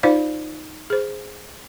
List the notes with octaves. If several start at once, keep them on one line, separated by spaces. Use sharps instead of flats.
D#4 F4 C5 D5 F5
G#4 C5